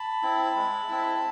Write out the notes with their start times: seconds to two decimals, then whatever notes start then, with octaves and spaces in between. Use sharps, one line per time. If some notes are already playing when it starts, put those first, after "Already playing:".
Already playing: A5 B5
0.23 C4 E4
0.56 G#3
0.89 C4 E4